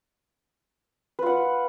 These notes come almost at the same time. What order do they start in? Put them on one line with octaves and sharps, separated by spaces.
B4 F4 F#5